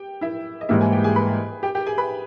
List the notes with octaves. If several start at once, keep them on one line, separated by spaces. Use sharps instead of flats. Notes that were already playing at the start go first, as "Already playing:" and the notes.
Already playing: G4 G5
E4 E5
D#5
G#2 E3 G3 A#3 E4 E5
G#4 G#5
G4 G5
G#4 G#5
B4 B5
G4 G5
G4 G5
G#4 G#5
B4 B5